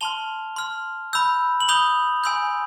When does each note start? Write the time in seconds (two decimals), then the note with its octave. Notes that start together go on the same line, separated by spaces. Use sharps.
0.01 A5 C6 F6 F7 G7
0.56 C6 F6
1.13 B5 E6 G6
1.60 F#7
1.68 B5 D#6 G6 F7 G7
2.24 G#5 C6 E6 G6